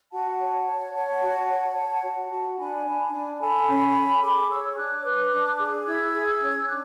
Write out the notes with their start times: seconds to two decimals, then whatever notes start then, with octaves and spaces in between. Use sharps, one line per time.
0.12 F#4 F#5 A5
0.39 C#5
0.67 C#5
0.94 C#5
1.21 F#4
1.49 C#5
1.76 C#5
2.03 F#4
2.31 F#4
2.58 D4 G#5 B5
2.85 D4
3.13 D4
3.34 A5
3.40 A4 G#5 B5
3.68 C#4
3.95 A4
4.22 G#4 B5 D6
4.50 C#5 C#6 E6
4.73 E6
4.77 D4 D6 F#6
5.04 B4
5.32 D4
5.59 G#4
5.86 E4 E6 G#6
6.14 G#4
6.41 C#4
6.68 D4 D6 F#6